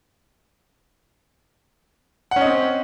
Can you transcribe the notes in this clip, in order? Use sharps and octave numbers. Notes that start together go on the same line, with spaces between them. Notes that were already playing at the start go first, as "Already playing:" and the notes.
C4 C#4 D#5 F#5